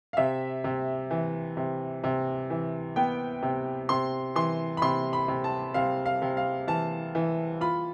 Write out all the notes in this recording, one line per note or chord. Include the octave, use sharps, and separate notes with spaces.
F5
C3 E5
C3
E3
C3
C3
E3
B3 G5
C3
C3 C6
E3 C6
B5
C3 C6
B5
C3
A5
C3 F5
F5
C3
F5
E3 A5
E3
F4 B5